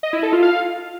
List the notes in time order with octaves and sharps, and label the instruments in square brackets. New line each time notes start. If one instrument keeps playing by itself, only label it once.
[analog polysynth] D#5
E4
A4
F4
F5